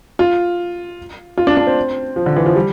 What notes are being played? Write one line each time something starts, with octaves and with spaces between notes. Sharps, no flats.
F4
F4
D4
D4
C4
F3
D3
E3
F3
G3